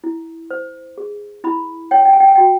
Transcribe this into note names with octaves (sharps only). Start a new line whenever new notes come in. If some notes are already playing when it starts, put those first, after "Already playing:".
E4
C5
G#4
E4 B5
C#5 G5
G#5
G5
G#5
G5
G#5
F#4 G5